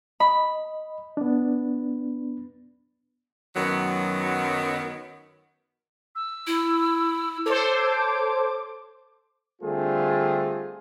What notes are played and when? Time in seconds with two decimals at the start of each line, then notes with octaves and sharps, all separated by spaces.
0.20 D#5 B5
1.17 B3 D4
3.56 F#2 D#3 F#3 B3
6.15 E6
6.47 E4
7.46 A4 C5 C#5 D6
9.62 D3 G3 A3 C4 F4 G#4